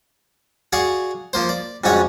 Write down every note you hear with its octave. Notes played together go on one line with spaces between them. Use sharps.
F#4 G#4 D5 F5 F#5
F3 A#3 C5
D5
F2 G#2 C#3 D4 F#4 C#5